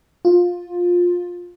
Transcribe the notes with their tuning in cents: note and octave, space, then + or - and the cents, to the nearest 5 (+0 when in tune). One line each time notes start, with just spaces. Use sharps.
F4 +15